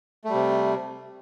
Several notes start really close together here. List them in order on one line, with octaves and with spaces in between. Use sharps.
A3 G3 C3